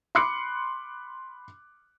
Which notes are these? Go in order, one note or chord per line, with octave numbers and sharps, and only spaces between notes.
B5 C6 D6 F#6 C7 C#7